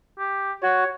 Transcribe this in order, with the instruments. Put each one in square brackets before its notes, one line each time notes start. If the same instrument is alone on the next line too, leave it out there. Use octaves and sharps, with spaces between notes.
[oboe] G4
[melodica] F#4 [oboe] C#5